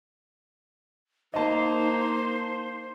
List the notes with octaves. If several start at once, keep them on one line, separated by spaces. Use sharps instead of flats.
A#3 D#4 C5 D#5 A5